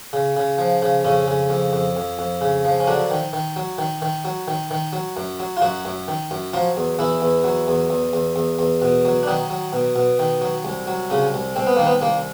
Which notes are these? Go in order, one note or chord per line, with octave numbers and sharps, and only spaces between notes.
C#3
C#3
F3
C#3
F2 C#3 C#4
C#3
F2
F2
F2
F2
C#3
F3
C#4
D3 F#3 D4
D#3
D#3
F#3
D#3
D#3
F#3
D#3
D#3
F#3
F#2
F#3
F4
F#2 F#3 F#4
F#2
D#3
F#2
F3 F#3 F4
E2
E2 E3 E4
E2
F#3
E2
E2
E2
E2
E2
B2
F#3
D4
D#3 F#3 D#4
F#3
B2
B2
D#3
F#3
C2
F#3
C2 C#3 C#4
C2
C2 C4
B3
D#3 A#3
B3
C2 A#3